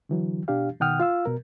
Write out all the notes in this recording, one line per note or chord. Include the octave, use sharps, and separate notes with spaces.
D3 E3 F#3
B2 D4 G4 F5
B2 D#3 F#5 G5 D#6 F6
F4 F5 E6
B2 A#4